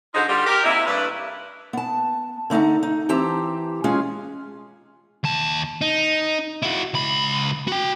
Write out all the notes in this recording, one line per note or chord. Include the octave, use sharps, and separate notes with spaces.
D3 D#4 F4 F#4 G#4 C5
D3 G3 F4 G4
G4 A#4
C3 A#3 D#4 E4
G2 A3 D4 B4
B3 A5
D3 A3 D#4 F#5 A#5
D#4
E3 C4 G4 A5 A#5
G#3 C#4 F4 G#4
D#2 A5
D#4
E4 F#4
C#2 B5
F#4 G5